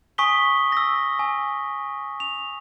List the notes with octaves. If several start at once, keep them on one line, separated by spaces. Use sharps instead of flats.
G#5 C#6 D#6 B6 G7
E6 A#6
G#5
F7